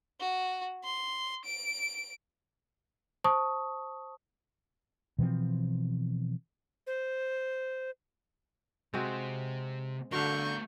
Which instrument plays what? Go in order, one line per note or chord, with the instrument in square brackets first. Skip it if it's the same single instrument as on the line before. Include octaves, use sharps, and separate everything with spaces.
[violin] F#4
C6
D7
[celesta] C5 A5 C#6 D#6
[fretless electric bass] B2 E3 F3 C4
[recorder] C5
[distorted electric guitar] C3 [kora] G#3 C4 F#4
[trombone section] D3 [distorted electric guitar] A3 A#4 [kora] F#4 F5 [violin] C#6 G6